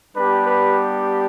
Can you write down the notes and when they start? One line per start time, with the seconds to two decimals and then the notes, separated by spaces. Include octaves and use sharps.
0.16 G3 B3 D4 G4 B4
0.47 B4